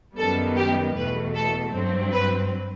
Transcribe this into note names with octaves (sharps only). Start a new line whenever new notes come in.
F#2 D#3 G3 B3 A4
G4
E2 B2 A3 B4
A4
G2 F#3 C4
B4